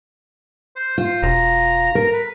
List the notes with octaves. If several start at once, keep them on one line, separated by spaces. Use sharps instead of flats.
C5
F4 C5
E1 A#5
A#4
B4